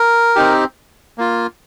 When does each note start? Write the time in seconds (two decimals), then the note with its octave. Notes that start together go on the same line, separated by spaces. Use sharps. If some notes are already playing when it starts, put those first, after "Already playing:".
Already playing: A#4
0.36 C4 D#4 G4
1.18 A#3 F4